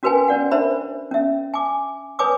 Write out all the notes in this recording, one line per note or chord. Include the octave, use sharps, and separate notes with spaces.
C#4 F#4 A#4 B4 G5 G#5
C#4 D5 F#5
D4 A#4 C5 E5 B5
C#4 E5
G#5 D6
B4 C#5 G#5 D6 D#6